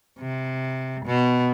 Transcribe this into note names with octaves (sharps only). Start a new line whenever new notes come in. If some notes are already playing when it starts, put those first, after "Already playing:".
C3
B2